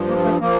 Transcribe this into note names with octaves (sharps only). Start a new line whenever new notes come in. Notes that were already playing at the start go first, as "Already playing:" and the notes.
Already playing: G2 F3
A#3
A3
F3 A#3